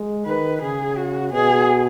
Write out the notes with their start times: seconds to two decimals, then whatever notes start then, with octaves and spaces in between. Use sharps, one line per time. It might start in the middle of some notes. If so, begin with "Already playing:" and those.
Already playing: G#3
0.25 D#3 B4
0.62 C#3 G#4
0.97 F#4
1.33 B2 G#4